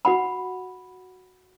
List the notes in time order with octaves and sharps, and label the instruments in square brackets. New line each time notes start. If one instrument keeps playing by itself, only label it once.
[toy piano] F#4 F#5 B5